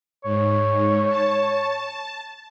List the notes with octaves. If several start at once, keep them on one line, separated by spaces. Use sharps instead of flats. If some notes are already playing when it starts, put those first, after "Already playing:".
G#2 C#5
A5